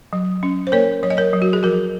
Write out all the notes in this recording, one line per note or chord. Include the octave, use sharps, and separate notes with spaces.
F#3
C#4
C5
A#3 A#4 C#5
F#3 C#5
D#5
A#4 C#5
F#3
F#4
G#4
F3 F#4 A#4